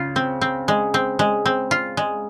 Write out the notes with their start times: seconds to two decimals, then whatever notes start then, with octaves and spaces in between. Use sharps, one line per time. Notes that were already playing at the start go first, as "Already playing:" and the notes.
Already playing: C#3 F4
0.16 C4
0.41 C4
0.68 G#3
0.94 C4
1.19 G#3
1.46 C4
1.71 F4
1.97 G#3